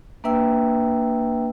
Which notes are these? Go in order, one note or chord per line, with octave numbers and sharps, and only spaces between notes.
A#3 D4 B4 E5 G5 E6